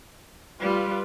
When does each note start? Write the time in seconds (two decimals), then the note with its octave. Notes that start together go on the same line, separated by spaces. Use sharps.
0.60 G3 F4 B4